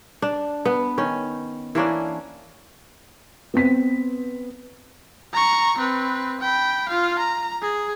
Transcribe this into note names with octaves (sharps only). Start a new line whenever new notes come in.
D4
B3
D#3 C#4
E3 A#3 C#4 D4
B3 C4 B6
A#5 C#6
C4 B4
G5 B5
F4 F5
A#5
G#4